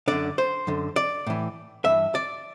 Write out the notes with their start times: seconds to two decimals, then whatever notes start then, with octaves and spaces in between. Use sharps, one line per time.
0.08 F#2 D3 D5
0.38 C5
0.67 F#2 D3
0.96 D5
1.27 A2 E3
1.85 G2 E3 E5
2.15 D5